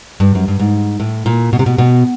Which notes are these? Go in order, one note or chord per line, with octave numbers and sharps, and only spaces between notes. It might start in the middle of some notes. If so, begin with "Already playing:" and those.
G2
F#2
G2
G#2
A2
A#2
B2
C3
B2
B2